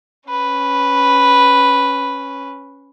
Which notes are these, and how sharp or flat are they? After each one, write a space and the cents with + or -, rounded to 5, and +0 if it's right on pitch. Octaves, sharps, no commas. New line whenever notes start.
C#4 -5 B4 +0